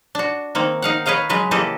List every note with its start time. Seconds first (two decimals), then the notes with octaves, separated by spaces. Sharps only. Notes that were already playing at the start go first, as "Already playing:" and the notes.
0.15 D4 F#4
0.55 D#3 A#3 C4
0.82 D#4 F5 F#5
1.06 B4 C#5 D#5 F5 A#5
1.29 C#3 F#3 G#3 B4
1.51 C#3 E3 A#3 G4 A4 D#5